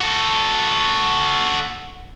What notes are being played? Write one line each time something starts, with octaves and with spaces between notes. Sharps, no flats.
F#4 A4